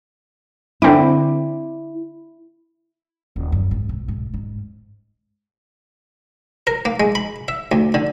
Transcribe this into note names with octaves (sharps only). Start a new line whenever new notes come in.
D3 C4 E4 D6
D#1
F#2
G#2
B1
G#2
G#2
A#4
A#3
G#3
B5
E5
D2
D3